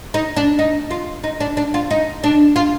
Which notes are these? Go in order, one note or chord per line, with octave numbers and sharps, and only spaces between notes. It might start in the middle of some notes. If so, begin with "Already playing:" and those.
D#4
D4
D#4
F4
D#4
D4
D4
F4
D#4
D4
F4